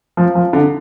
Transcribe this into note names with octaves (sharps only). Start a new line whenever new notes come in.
F3
F3
D3